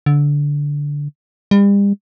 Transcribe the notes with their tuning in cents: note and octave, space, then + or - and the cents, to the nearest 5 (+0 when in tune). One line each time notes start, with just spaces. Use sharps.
D3 -15
G3 +40